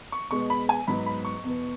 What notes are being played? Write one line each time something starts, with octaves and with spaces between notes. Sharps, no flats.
C#6
B2 G#3 B3 C#6
B5
G#5
G#2 F#3 B3 B5
B5
C#6
E2 B2 B3